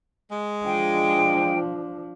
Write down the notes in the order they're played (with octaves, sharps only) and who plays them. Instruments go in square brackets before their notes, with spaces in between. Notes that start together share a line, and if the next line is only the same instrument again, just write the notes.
[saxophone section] G#3
[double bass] F3 D4 [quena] G5